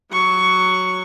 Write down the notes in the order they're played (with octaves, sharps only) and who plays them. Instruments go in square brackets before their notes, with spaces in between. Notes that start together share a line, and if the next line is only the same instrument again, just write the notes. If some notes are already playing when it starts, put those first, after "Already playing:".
[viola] F#3 C#6